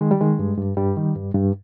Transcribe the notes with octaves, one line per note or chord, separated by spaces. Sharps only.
D#3 G#3
G3
D#3 G#3
G2
G2
G2 G3
D#3
G2
G2